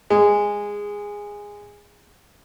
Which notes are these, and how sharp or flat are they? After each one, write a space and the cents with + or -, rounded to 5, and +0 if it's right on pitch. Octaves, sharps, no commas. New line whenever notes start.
G#3 -15